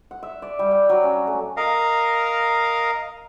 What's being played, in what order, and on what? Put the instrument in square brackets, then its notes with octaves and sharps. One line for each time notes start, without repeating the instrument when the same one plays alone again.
[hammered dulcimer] F#5
E5
D5
G3
G5
F#3
C#4
A3
[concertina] A#4 D#5 F5